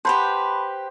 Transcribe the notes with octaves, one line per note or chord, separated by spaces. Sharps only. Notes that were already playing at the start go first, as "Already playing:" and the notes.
G4 B4 C5 F#5 A5 B5